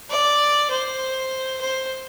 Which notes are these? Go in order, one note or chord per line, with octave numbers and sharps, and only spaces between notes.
D5
C5
C5